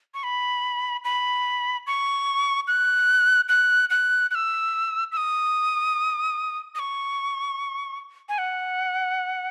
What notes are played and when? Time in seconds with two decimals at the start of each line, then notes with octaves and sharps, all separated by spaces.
0.14 C#6
0.23 B5
1.04 B5
1.87 C#6
2.68 F#6
3.49 F#6
3.90 F#6
4.31 F#6
4.35 E6
5.12 E6
5.17 D#6
6.75 D#6
6.79 C#6
8.29 G#5
8.38 F#5